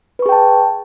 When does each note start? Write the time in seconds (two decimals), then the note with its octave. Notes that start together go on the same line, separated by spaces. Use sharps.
0.19 B4
0.22 C#6
0.26 G#4
0.29 G5
0.32 A5